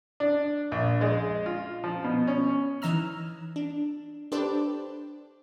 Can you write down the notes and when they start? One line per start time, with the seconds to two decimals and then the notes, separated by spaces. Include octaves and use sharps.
0.20 D4
0.72 A#1
1.01 G#3
1.46 F4
1.84 F3
2.04 B2
2.27 C#4
2.82 E3 D#4 D#5 A#5 E6 F6
3.56 D4
4.32 D4 G4 A4 B4 C5 D5